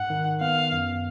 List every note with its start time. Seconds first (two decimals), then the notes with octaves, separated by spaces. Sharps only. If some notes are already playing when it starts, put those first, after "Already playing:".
Already playing: G#2 F#5
0.10 D#3
0.41 B3 F5
0.72 F#2